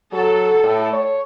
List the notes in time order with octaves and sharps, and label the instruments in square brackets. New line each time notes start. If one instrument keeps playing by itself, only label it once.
[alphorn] F#3 [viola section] A4
[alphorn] A2
C#5